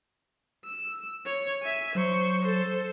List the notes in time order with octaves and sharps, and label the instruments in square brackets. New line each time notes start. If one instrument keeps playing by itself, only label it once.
[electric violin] E6
C#5
E5 G#5
[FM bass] F#3 [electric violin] C5 C#6
[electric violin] A4 C5